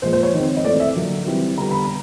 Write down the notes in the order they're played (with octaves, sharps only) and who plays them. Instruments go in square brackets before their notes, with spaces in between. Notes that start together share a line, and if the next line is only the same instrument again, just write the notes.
[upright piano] A#2 F3 G#3 C5
C5
C#5
D#3 G#3 C4
D#5
A2 E3 A3 C4 D5
E5
D3 F#3 A#3
E3 G3 C4
D3 G3 B3 A#5
B5
A#5